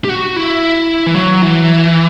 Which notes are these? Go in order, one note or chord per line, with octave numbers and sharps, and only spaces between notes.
G4
F#4
E4
E3
F#3
E3